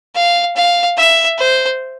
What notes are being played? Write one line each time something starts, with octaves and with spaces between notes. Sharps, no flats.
F5
F5
E5
C5